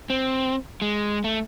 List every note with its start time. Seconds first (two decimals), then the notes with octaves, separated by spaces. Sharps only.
0.10 C4
0.82 G#3
1.24 A3